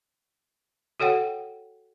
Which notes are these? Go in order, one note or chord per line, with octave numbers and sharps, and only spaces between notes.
F#4 A4 C#5 F#5 G5